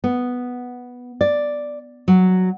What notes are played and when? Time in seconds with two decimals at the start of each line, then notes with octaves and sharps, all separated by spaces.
0.04 B3
1.21 D5
2.08 F#3